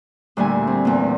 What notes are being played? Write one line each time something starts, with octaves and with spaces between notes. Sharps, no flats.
D2 A#2 G3 E4 G#5
C4
E2 A#2